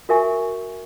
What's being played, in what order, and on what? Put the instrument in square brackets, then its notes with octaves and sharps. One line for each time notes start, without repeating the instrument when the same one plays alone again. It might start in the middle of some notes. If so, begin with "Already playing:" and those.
[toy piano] F#4 A#4 E5 G#5 C#6